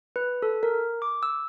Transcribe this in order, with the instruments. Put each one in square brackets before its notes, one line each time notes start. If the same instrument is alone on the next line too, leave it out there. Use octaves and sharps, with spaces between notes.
[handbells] B4
A4
A#4
D6
E6